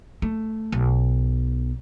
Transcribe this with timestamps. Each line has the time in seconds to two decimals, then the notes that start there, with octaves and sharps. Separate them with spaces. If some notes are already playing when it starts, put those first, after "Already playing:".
0.22 A3
0.72 B1